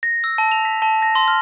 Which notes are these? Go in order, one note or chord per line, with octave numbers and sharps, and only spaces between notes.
A#6
E6
A5
F7
B6
A5
A#6
C6
F6